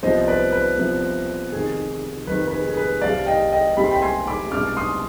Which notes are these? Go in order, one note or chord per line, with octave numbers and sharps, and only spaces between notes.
C2 C3 F3 B3 C5 D#5
B4 D5
B4
C2 C3 F3 B3
F1 F2 D#3 G#4
F1 F2 D#3 B4
B4
G#4
G#4
B4
C2 C3 G3 D5 F5
D#5 G5
D#5 G5
C2 C3 G3 B5
C6
G5 B5
G#5 C6
B5 D6
C2 B2 G#3 D4 D6 F6
C6 D#6